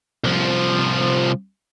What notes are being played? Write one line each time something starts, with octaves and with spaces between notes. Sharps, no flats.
C2 F3